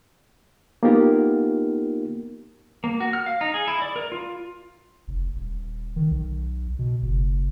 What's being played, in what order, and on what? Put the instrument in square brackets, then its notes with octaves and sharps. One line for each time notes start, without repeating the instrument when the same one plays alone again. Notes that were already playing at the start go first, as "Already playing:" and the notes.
[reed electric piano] A#3 B3 D#4 F4 G4 A#4
[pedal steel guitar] A#3
F#4
F6
F5
D#4
G#4
E4
D5
A#4
F4
[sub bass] F1
D#1
D#3
B1
B2
F#1